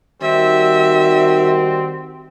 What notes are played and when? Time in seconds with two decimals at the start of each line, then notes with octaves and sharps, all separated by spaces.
0.22 D#3 G3 C4 F#4 E5